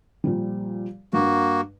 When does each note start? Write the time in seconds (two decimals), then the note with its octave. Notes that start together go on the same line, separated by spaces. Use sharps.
0.24 A#2 F3 G3
1.13 G2 A#3 F#4